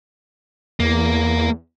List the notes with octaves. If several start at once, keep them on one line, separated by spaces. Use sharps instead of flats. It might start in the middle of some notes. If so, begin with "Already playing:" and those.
E2 A#3